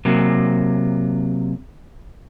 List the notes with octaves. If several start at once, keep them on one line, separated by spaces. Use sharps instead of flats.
C3 F#3 A#3